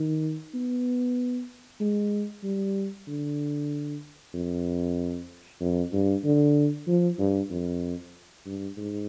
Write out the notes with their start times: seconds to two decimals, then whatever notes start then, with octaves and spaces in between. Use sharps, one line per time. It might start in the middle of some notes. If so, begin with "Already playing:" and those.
Already playing: D#3
0.54 B3
1.80 G#3
2.44 G3
3.08 D3
4.34 F2
5.61 F2
5.93 G2
6.24 D3
6.88 F3
7.19 G2
7.50 F2
8.46 G2
8.77 G#2